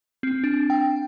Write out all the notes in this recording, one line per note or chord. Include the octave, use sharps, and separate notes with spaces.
C4
D4
G5